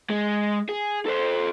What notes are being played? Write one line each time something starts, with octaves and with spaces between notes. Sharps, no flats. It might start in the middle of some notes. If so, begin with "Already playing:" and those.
G#3
G#4
A4 C5